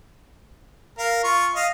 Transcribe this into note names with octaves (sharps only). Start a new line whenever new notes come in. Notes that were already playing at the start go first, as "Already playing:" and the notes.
A#4 F5
F4 C#6
D#5 F5